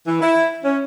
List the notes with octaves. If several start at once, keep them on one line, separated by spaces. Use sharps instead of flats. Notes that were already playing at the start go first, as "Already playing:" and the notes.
E3
E4
C#4